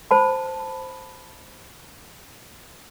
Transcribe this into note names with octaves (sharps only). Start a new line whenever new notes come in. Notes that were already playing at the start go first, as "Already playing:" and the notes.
C5 A5 B5